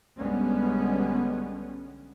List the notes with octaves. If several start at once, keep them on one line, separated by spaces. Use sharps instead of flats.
B1 D3 G3 G#3 B3 C#4